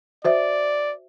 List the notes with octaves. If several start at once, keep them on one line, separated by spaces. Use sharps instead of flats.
F#4 C5 D5 E5